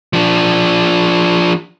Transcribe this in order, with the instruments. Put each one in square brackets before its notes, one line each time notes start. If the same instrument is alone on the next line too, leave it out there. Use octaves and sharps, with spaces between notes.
[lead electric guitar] F3 D4